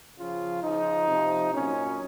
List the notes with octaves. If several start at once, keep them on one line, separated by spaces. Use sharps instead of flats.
C#3 F3 F4
C#3 F3 D#4
C3 F3
A#2 F#3 C#4